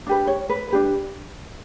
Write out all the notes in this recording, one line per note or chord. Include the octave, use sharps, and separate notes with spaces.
D4 G4 B4
C#5
B4
D4 G4 B4